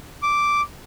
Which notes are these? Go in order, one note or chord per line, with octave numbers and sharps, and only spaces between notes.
D6